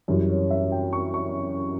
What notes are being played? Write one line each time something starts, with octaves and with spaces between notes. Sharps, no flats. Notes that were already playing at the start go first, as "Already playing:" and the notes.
F#2 E3 G3 C#5
C#5
E5
G5
C#6
C#6